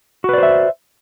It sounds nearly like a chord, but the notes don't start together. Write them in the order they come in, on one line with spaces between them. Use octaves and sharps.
F#4 B4 D5 C5 E5